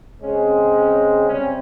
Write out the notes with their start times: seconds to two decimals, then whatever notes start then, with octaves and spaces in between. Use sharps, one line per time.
0.21 C#3 G#3 C4 C#4
0.74 C#4
1.27 C3 G3 C4 C#4